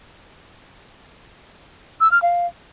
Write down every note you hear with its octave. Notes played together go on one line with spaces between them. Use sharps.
E6
F6
F5